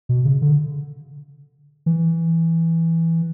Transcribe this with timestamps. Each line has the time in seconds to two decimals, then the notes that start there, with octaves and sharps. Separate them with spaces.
0.09 B2
0.25 C#3
0.42 D3
1.86 E3